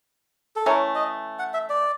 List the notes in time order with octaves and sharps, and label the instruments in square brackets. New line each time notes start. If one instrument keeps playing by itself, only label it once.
[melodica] A4
[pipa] E3 A3 C#4 [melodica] A#4
[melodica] D#5
F#5
E5
D5